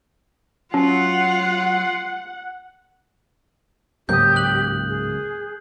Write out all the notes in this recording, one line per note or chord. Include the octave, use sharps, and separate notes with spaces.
F#3 C#4 F4 F#5
C#2 G#2 C#3 F#3 A#3 G4 D#6 G6
F#6 F#7
G#4